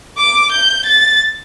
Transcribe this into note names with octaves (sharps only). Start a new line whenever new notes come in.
D6
G6
A6